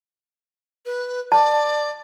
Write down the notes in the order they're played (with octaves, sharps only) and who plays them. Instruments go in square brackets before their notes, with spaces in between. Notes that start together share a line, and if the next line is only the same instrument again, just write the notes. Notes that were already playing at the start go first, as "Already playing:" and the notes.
[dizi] B4
[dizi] D5 [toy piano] A5